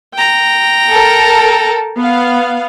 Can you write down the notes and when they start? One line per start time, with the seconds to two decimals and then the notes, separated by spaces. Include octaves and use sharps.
0.14 G5 A#5
0.91 A4 A#4
1.98 B3 F5